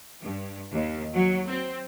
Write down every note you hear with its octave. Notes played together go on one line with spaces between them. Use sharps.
G2
D#2
F#3
C4